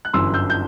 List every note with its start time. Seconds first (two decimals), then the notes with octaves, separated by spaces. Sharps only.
0.05 F#6
0.13 G1 F#2 E3 C6 E6
0.34 E6 G6
0.50 G6